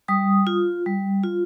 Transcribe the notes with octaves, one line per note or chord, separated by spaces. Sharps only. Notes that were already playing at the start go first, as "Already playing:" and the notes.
G3 D#6
F4
G3
F4